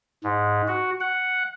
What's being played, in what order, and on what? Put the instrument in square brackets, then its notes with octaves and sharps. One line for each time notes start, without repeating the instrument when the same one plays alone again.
[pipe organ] G#2
F#4
F#5